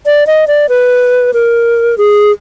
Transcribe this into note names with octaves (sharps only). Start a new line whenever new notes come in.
D5
D#5
D5
B4
A#4
G#4